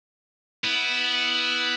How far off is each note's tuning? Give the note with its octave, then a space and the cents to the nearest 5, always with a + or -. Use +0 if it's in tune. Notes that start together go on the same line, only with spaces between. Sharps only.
B3 +0 E4 -15